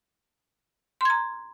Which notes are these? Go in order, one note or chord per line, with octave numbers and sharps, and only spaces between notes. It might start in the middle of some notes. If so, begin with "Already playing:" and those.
A#5 C6 G#6